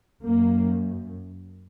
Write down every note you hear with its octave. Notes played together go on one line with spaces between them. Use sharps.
F#2 A#3